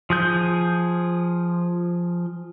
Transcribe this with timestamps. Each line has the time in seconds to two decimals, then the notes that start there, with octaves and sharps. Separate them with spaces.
0.10 F3 G#4 G6